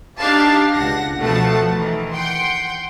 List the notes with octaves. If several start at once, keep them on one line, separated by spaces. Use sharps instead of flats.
D4 D#4 G4 D5 F5 A5
C#2 F#5 A#6
B2 F3 A3 F#5 A5
D#3 E3
F#5 G5 C6